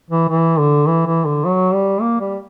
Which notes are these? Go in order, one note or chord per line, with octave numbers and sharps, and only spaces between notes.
E3
E3
D3
E3
E3
D3
F#3
G3
A#3
G3